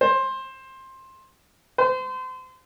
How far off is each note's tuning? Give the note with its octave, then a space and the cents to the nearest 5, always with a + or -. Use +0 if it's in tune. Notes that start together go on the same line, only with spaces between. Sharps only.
C5 +15
C5 -35